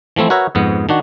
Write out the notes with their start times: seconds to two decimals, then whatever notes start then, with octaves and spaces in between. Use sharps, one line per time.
0.16 E3 F3 A3 C4 E4
0.30 F#4 A#4 B4 C#5 E5
0.55 F2 G#2 B3
0.89 D#3 D4 F#4